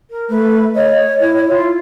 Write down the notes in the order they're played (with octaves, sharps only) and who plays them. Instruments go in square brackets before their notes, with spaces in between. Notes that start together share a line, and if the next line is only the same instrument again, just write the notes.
[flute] A#4
[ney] A3 [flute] B4
[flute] C#5 [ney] D#5
[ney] E4
[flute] F4